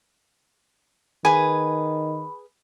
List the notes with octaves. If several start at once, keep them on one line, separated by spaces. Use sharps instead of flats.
D#3 G#4 B4 G#5 B5